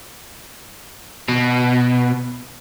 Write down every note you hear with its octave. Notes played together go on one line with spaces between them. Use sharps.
B2